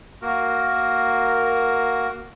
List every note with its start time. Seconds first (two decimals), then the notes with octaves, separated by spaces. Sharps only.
0.22 A#3 F#4 A#4